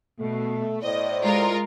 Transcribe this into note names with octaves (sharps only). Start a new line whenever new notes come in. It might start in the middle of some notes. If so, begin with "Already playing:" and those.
B2 A3
A2 C5 D5 D#5
G#3 F4 A#4